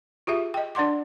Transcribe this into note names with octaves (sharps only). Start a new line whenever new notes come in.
F4 G4 G#4 E5
D#5 G5
D4 D5 F#5 C6 D6